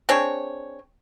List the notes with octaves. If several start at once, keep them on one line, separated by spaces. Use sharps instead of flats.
C4 D4 G#4 C#5